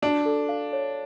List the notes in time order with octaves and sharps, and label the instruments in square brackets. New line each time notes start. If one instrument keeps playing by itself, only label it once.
[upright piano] D4 [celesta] F#4
[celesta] A4
F5
C#5